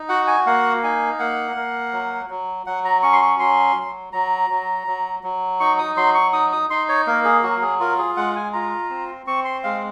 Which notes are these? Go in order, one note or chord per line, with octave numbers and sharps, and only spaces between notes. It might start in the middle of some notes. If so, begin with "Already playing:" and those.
Already playing: D#4
F#4 F#5
G#5
A#3 F#5
D#4 G#5
A#3 F#5
A#3
F#3
F#3
F#3 F#5
A#5
C#4 C#6
C6
C#6
F#3 C6
F#3
F#3 A#5
F#3
F#3
F#3
D#4 C#6
D#6
F#3 C6
C#6
D#4 D#6
D#6
D#4 C6
C#5
A#3 A#4
G#4
F#3 F#4
G#4
F4 A#4
G#4
G#3 F#5
G#5
F4 A#5
C4
C4 C#6
C6
G#3 F5